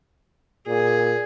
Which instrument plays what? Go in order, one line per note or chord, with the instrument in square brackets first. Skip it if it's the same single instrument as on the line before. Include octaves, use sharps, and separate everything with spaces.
[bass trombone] A#2 [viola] G#4